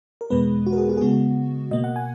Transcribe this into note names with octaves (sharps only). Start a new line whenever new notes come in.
A#4
E2 B2 G#3 B3 B4
F#4
A#4
G#4
F#4
G#4
C#3 G#3 B3 F#4
B2 A#3 D#5
F#5
G#5